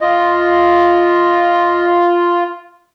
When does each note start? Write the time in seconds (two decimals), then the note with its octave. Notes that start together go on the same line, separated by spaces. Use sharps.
0.01 F4 D#5